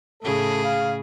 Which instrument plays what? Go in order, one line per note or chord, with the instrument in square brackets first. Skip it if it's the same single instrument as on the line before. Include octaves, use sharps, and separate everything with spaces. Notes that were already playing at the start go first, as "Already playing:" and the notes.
[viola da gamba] A2 C#3 G#4 [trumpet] A4
[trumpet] F5